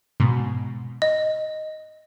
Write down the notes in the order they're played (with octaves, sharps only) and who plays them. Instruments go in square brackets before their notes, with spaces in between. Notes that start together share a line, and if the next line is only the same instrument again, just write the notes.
[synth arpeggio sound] G#2 B2
[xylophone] D#5